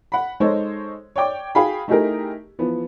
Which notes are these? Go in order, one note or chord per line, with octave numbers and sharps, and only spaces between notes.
F#5 B5
G#3 D#4 A4 C5 C#5
C#5 D5 G5 D6
F#4 G#4 F5 G5 B5
A3 D#4 E4 G4 G#4 A#4
E3 F3 B3